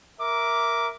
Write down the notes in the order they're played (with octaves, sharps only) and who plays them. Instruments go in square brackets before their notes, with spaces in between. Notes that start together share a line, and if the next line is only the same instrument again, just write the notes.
[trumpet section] A#4 E5 D6